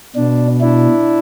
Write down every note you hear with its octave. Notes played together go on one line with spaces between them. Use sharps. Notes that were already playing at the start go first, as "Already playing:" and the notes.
B2 D4
D4 E4